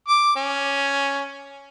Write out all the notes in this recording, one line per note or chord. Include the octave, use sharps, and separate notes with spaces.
D6
C#4